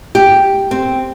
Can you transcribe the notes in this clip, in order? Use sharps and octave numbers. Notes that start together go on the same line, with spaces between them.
G4
C4